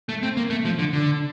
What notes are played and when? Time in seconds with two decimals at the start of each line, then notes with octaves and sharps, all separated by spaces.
0.09 A3
0.23 C4
0.37 A#3
0.50 A3
0.65 F3
0.79 D3
0.93 D3